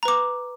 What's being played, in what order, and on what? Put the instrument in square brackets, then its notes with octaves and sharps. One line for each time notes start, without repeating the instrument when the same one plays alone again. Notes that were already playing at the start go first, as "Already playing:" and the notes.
[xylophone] A#5
B4
D6